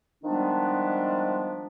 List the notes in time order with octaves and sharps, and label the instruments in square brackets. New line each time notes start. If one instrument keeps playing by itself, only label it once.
[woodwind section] D#3 F3 G3 G#3 B3 D4